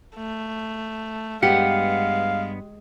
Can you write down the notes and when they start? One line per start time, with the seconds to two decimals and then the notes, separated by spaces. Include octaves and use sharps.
0.16 A3
1.43 G2 G#3 B3 G4 F5 F#5